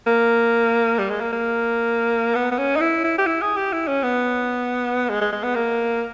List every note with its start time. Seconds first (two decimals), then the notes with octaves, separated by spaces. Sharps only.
0.07 A#3
0.99 G3
1.10 G#3
1.21 A#3
1.33 A#3
2.35 B3
2.52 B3
2.58 C#4
2.77 D#4
2.81 E4
3.04 E4
3.19 G4
3.26 E4
3.42 G#4
3.57 G4
3.73 E4
3.88 C#4
4.03 B3
5.09 G#3
5.22 G#3
5.33 G#3
5.44 B3
5.55 A#3